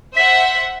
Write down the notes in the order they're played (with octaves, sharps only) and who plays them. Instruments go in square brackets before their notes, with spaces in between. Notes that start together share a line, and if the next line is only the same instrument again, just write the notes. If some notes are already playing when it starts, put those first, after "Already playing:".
[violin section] C5 E5 F#5 [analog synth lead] B6